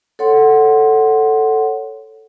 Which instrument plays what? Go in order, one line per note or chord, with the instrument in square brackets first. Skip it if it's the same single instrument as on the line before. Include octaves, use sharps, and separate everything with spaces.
[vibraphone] A4 C#5 F#5 C6